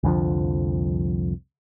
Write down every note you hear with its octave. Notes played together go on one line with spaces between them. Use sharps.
C2 F2 D3 F3